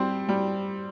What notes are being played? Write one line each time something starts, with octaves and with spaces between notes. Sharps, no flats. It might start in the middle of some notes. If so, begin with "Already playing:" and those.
Already playing: G3 C4 C5
G3